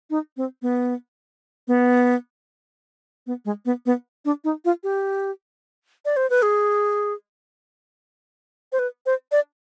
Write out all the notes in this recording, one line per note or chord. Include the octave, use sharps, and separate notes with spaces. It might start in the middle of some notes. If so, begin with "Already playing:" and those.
D#4
C4
B3
B3
B3
G#3
B3
B3
D4
D#4
F4
G4
D5
C5
B4
G#4
C5
B4
C5
D5